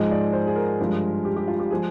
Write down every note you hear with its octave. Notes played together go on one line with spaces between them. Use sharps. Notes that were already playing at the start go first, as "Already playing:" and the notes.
Already playing: G#2 F3 G#3 D#5
D5
C5
G#4
A#4
G2 F3 G#3
G4
G4
F4
G4
F3 G#3 G#4